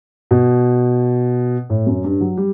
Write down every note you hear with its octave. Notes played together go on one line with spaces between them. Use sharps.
B2
A2
F#2
G2
F#3
G3